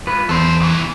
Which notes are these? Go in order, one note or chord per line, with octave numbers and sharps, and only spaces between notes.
F4 B4
E2 A4 C5
C2 E3